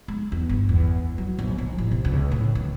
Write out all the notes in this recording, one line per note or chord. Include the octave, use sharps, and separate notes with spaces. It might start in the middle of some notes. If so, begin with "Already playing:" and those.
G#3
E2
G1
E2
F#3
A#1
A#1
A1
C3
C#2
A2
D#3